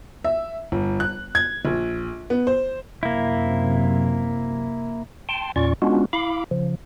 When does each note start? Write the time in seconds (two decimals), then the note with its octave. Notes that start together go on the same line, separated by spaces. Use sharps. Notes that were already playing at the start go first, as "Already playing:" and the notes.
0.24 E5
0.72 G1
1.00 F#6
1.35 G#6
1.65 A#1
2.30 B3
2.47 C5
3.03 F#2 C3 A#3 E4
5.29 G5 A5 C6
5.56 E2 A#2 C#4 F4 D5 C#6
5.82 G#3 B3 C#4 D4 F4 F#4
6.13 E4 F5 B5 D6
6.51 C#3 F3